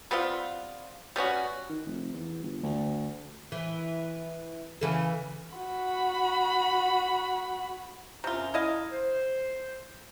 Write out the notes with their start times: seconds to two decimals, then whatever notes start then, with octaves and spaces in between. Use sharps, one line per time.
0.11 G3 B3 C4 F4
1.16 G3 B3 C#4 F#4
1.69 D#3
1.87 F1
2.13 E2
2.42 G1
2.63 D2
3.52 E3
4.81 C#3 E3 A4
5.55 F#4 B5
8.24 F#2 C3 F4 A#5
8.54 E4 D#5 F5
8.92 C5